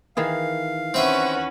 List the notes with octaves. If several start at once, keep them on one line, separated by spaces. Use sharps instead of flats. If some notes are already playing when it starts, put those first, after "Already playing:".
D#3 E3 G#4 F5
C4 C#4 F#4 B4 E5